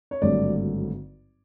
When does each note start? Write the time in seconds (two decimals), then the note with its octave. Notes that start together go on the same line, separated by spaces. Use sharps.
0.11 C#5
0.21 G#1 G2 D3 F#3 A3 D5